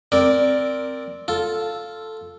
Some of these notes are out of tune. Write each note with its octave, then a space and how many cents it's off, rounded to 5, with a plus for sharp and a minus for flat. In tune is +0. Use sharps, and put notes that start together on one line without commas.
C4 +0 A#4 +0 D5 +0
F4 +0 A4 +0